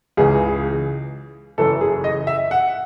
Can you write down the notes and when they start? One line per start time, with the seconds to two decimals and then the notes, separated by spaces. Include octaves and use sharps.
0.17 C#2 C#3 E3 G#4
1.58 F#1 F#2 E3 A4
1.81 G#4
2.04 D#5
2.27 E5
2.51 F#5